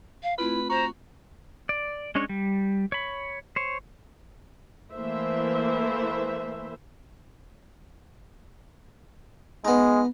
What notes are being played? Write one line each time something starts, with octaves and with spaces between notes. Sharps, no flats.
F5
A3 C4 E4 F4 B4
F#4 C5 A#5
D5
G#3 C#4 D4 C#5
G3
C#5 B5
C5 C#5
E3 A3 A#3 C5 E5
G#3 B3 D#4